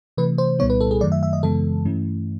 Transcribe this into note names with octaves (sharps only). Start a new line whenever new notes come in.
C3 E3 A3 B4
C5
C2 A#2 G3 B3 D#4 C#5
B4
A4
G#4
F#2 D#3 F#3 A3 D5
E5
E5
D#5
F#2 C#3 E3 G#3 B3 A4
G2 E3 A3 C#4 E4